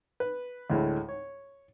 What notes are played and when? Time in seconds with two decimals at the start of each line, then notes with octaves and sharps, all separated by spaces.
0.20 B4
0.70 D2 A2 G#3 E4
1.09 C#5